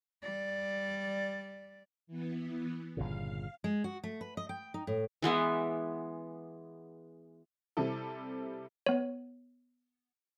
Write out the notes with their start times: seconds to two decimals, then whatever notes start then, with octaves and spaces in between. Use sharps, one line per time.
0.22 G3 D5
2.07 E3 B3
2.97 G1 A#2 C#3 F5
3.64 G#3
3.84 F#4
4.04 A3
4.21 B4
4.37 D#5
4.49 G5
4.74 D#4
4.87 A2
5.22 E3 G#3 B3 E5
7.77 C3 G3 C4 E4 A4
8.86 B3 C#5